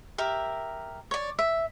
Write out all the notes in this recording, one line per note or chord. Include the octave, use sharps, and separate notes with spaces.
G4 A#4 E5
C#5 D5
E5